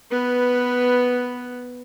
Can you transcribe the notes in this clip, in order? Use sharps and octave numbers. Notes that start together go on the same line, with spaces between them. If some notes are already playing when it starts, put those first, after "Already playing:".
B3 B4